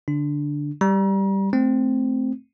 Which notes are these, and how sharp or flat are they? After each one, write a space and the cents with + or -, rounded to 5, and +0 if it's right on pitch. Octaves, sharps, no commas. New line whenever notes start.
D3 -10 D4 +0
G3 +0 A#5 +40
A3 +0 C4 +0